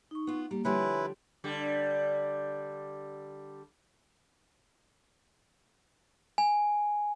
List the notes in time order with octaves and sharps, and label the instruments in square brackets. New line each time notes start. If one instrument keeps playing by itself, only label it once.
[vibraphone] D#4 C#6
[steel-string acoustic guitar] B3 F4
[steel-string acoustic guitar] G3 [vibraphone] A#3
[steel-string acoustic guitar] D3 F3 G3 [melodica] E4 B4 [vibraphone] C#5 G#5 C6
[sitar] D3 G3
[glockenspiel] G#5